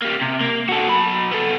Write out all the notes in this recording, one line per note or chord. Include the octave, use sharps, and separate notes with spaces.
G3 A#3
C3
A#3
F#4 A4
F#3 B5
B3 A4